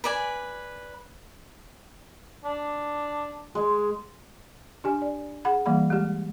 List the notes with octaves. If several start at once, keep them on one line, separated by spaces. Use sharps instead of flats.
B4 D5 G#5
D4
G#3
D4 G4 G#5
D5
G#4 F#5 B5
E3 G3 A#3 F#5 B5
G#3 G4